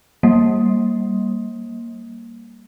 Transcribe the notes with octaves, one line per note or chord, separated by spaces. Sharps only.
G3 A#3